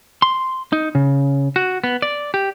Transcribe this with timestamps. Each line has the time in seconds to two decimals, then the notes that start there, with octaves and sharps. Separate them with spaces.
0.22 C6
0.73 D#4
0.95 C#3
1.56 F#4
1.84 B3
2.02 D5
2.34 G4